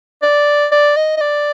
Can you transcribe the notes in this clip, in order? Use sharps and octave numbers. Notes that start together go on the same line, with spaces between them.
D5
D5
D#5
D#5
D5